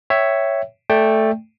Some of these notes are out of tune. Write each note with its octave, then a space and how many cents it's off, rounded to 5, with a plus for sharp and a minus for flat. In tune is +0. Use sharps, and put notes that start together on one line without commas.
C#5 +0 E5 +0 G5 -20
A3 +0 D5 +0 G5 +10